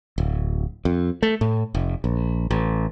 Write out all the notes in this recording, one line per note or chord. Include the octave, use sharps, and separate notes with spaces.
D1
F2
A3
A2
F1
A#1
A1